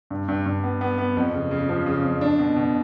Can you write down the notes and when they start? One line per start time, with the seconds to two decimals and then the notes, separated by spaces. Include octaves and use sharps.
0.11 G2
0.28 G2
0.46 G2
0.64 B3
0.81 B3
0.98 B3
1.17 F2
1.33 C#3
1.51 C#3
1.69 F3
1.86 C#3
2.04 F2
2.21 D4
2.39 B2
2.56 B2